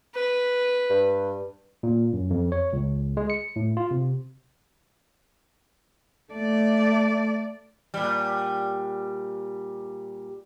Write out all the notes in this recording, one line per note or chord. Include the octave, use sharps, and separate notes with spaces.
B4
G2
A#2
F#2
F2
C#5
C#2
G#3
C#7
A2
F4
C3
A3 D5
A#2 G3